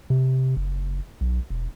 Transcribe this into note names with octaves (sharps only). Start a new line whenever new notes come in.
C3
F#1
B1
E1